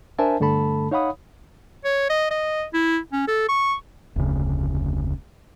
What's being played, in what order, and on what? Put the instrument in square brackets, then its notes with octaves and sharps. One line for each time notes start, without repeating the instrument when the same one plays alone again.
[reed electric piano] D4 A#4 C5 E5 G#5 A5
G2 D3 A3 A4 A5 B5
D#4 C#5 F5 F#5 B5 D#6
[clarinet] C#5
D#5
D#5
E4
C#4
A4
C#6
[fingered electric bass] F1 D2 C#3